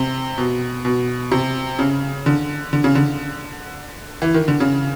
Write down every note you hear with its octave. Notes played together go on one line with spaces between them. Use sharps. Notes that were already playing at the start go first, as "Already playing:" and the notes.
Already playing: C3
B2
B2
C3
C#3
D3
D3
C#3
D3
E3
D#3
D3
C#3